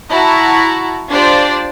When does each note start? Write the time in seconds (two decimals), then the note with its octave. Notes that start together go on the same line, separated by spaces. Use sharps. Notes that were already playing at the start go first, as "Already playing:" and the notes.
0.10 E4 F#4 A5 A#5
1.09 D4 F4 G4 C5 D5